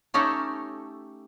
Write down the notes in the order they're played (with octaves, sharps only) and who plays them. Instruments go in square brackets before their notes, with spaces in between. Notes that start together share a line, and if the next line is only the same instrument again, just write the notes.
[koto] A3 C#4 D#4 G4 A4